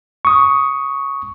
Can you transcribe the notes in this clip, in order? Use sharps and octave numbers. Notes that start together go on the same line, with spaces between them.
C#6 D#6